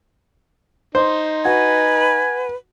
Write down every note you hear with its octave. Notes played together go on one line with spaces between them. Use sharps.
D#4 C5
F#4 B4 G#5